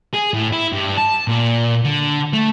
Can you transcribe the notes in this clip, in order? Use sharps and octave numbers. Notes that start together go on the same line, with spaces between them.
G#4
A2
E4
G2
A5
A#2
D3
A3